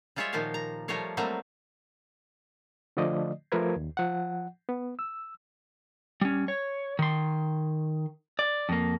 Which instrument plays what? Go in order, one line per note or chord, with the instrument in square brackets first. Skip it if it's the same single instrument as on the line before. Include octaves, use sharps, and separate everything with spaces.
[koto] G3 G#3 F4 C#5 D5 E5
A#2 D#3 F3 A#3 G4 F5
A#5
F3 G3 A3 A#4 C#5 F5
F#3 G3 A3 A#3 C4 E4
[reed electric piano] D3 F3 A3 D5 D#5
F3 A3 A#4 B4 G#6
D#2
F3 F#5
B3
E6
[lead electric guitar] G3 C#4
C#5
D#3 C6
D5
F2 A#3